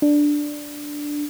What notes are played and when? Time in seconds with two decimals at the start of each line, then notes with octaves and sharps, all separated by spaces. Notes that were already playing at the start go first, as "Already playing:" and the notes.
0.02 D4